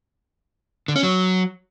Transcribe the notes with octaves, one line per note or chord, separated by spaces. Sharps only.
D3
C#4
F#3